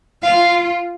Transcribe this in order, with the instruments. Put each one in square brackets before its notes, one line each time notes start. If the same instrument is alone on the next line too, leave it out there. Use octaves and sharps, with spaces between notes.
[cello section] F4 [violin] F5